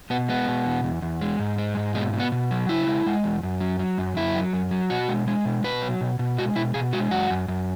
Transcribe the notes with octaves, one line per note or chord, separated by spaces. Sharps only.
B2 B3
G#3 B3
B2
E2
E2
E2
G#3
G#2
G#3
G#2
B2 G#3
B2
B3
B2
F#3
C#3 E4
G#3
G#3
E2
F#2
F#3
F#3
F#2
F#2 E4
F#3
F#2
F#3
B2 F#4
G#3
G#3
B2
B2 B4
F#3
B2
B2
G#3 F#4
B2 E4
B2 G#4
G#3 F#4
F#2 F#4
F#2
F#2